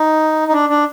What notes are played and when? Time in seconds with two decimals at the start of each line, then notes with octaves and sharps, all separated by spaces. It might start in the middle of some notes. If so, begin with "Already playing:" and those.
Already playing: D#4
0.48 D#4
0.53 D4
0.69 D4